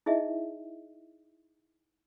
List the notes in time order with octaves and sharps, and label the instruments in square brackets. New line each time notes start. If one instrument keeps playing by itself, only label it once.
[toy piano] D#4 E4 G#4 D#5 E5